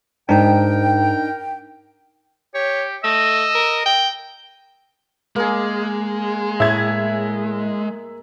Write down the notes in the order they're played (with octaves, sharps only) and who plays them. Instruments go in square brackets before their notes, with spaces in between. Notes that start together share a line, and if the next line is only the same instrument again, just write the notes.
[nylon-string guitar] G#2 [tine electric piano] D4 D#4 [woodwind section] A#4 G5
[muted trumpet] G4 [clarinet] C#5
[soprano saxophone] A3 [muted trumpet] D#5 [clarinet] E6
[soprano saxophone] A#4
G5
[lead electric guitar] G#3 [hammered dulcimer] A#3 G#4
[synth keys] A2 [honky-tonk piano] E5 G#6